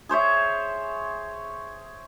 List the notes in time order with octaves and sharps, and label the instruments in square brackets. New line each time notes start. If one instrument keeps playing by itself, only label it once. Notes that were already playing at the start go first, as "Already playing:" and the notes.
[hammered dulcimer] G#4 C5 C#5 E5